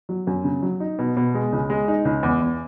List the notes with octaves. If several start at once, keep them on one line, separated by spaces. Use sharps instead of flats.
F#3
F#2
C#3
F#3
D#4
B2
B2
G#3
C#2
G#3
D#4
C#2
E2
E2